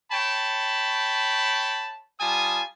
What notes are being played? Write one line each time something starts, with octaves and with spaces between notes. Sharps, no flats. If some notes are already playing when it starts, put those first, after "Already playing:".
C#5 G5 A5 B5
G3 F4 G#5 A5 D#6